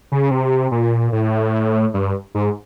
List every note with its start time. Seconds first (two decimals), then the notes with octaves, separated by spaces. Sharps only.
0.12 C#3
0.31 C3
0.71 A#2
1.12 A2
1.94 G2
2.35 G#2